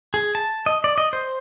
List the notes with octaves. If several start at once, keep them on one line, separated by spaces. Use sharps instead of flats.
G#4
A5
D#5
D5
D#5
C5